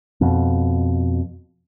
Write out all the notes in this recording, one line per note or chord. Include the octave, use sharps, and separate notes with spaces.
F2 B2